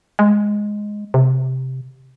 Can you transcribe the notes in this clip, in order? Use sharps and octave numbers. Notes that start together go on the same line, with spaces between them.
G#3
C3